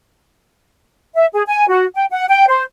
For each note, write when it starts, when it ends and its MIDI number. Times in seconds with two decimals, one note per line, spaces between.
1.15 1.27 76
1.33 1.43 68
1.47 1.66 80
1.68 1.85 66
1.95 2.05 79
2.11 2.25 78
2.27 2.45 79
2.48 2.63 72